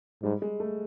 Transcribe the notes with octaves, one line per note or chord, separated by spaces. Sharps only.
G#2 G3
G#3
A3